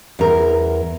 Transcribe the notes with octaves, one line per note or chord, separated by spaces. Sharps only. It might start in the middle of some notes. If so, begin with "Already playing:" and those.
E2 A#4